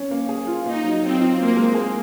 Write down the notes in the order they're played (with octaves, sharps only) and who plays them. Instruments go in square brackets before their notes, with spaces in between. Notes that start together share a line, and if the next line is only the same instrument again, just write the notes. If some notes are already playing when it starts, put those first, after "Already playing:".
Already playing: [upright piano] C#4
A#3
G#4
F4
[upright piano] A#3 [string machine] D#4
[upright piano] F#3
[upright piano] F#3 [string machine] C4
[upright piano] F4
[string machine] A#3 [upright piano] C4
[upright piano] G#3
G#4